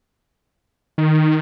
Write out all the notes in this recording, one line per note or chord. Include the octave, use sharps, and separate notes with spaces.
D#3